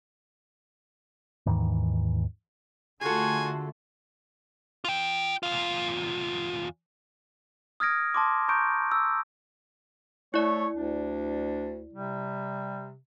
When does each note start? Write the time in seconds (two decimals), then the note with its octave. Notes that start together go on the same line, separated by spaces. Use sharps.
1.46 D#2 G#2 D#3 E3
3.01 D3 A3 F4 F#4 G#4 A4 G#5
4.85 F4 G5
5.43 E2 F4
7.80 D#6 F6 G#6 A#6 D7
8.14 A5 C6 D6
8.48 A#5 C#6 G6 D7
8.92 E6
10.34 A3 E4 C#5 D5
10.76 D2 D4
11.93 C3 G3